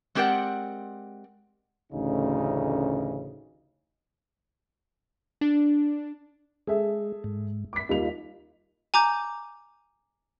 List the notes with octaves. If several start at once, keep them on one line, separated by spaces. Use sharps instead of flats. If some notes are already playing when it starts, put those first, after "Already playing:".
G#3 C4 G4 A#4 D5 F#5
A1 D2 C#3 D#4
D4
G#3 G#4 A4 E5
G#2
D6 B6
D#2 G3 D#4 F4 F7
G#5 A#5 D6 G6